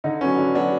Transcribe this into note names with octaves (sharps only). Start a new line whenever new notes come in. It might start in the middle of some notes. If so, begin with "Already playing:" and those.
D3 D#4
F#3 B3 C#4
D3 D4
F#3 B3 D4